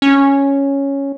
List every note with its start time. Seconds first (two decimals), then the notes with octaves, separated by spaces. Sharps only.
0.02 C#4